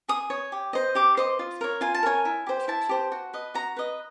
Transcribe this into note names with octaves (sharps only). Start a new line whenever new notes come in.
G#4 D#6
C#5
G4
C5 D#5
G4 D6
C5 D#5
F4
A#4 C#5
F4 G#5
A5
A#4 C#5 G#5
E4
G4 C5
E4 A5
G4 C5
F#4
B4 D#5
F#4 A#5
B4 D#5